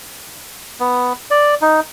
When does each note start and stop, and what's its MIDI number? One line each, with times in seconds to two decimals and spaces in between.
0.80 1.13 59
1.31 1.55 74
1.61 1.80 63